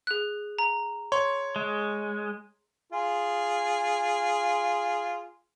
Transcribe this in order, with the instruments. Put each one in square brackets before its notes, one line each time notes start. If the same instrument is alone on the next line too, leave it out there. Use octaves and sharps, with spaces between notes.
[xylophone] G#4 F#6
A#5
[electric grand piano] C#5 [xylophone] C6
[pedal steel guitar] G#3
[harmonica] F4 G#4